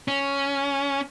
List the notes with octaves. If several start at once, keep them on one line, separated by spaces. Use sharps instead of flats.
C#4